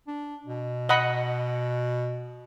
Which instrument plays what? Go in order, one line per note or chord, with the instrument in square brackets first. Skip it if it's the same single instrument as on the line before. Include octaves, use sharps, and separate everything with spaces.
[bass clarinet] D4
B2
[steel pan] D#5 F#5 B5